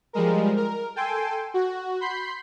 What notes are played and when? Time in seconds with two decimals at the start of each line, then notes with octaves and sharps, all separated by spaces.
0.13 F3 G3 G#3 A#4
0.57 A#4
0.96 A4 G5 G#5 C6
1.54 F#4
2.00 B5 C6 G6 B6 C7